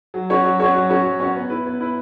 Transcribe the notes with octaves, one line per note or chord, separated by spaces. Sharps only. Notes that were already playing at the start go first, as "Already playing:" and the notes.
F#3
C#4 F#4 C#5
F#3
C#4 F#4 C#5
F#3
C#4 F#4 C#5
F#3
C#4 F#4 C#5
B3
E4 B4
B3
E4 B4